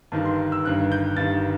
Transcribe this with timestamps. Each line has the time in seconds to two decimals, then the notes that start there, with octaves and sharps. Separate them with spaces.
0.12 G1 G2 D#3 A5
0.26 C6
0.52 E6
0.64 G1 G2 D#3 F#6
0.92 G6
1.17 G1 G2 D#3 A6